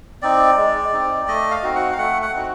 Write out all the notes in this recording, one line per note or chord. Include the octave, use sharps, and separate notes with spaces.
C4 D#4 D5
G#3
C4 D#4
A3 D#5
F5
C4 D#4 F#4
F#5
F5
A3 F#5
F#5
C4 D#4 F#4